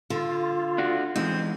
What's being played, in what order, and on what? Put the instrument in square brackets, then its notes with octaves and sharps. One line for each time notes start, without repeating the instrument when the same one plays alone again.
[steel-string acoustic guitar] D3 [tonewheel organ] F4
[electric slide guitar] D4 F#4
[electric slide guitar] E3 G#3 D#4 [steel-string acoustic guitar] C4